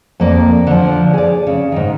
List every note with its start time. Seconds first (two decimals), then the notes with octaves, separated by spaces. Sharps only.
0.20 F2 A#3 D5
0.67 D3 F3
1.13 G#4 D5
1.47 C#3
1.72 G#2 D#3